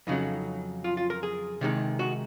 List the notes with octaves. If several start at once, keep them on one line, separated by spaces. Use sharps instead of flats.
F2 C#3 F#3 D#4
F4
F4
A#4
G#4
C3 D#3 G#3 D#4
F#4